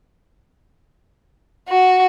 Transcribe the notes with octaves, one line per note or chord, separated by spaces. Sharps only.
F#4